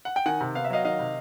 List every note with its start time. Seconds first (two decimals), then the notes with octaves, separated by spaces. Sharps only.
0.05 F#5
0.16 G5
0.26 D#3 F#5 G#5
0.41 C3
0.55 B3 F5
0.65 E5
0.70 F#3 D#5 F5
0.85 D#3 D#5 F5
0.99 C3